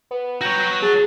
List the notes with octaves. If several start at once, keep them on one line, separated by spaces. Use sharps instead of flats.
B3
F#4 C#5 G5 A#5
G#4 A5